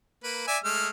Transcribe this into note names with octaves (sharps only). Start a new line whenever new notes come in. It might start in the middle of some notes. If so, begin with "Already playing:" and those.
A#3 B4
D5 E5 G#5
G#3 A3 F6